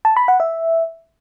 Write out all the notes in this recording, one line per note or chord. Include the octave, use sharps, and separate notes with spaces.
A5
B5
F#5
E5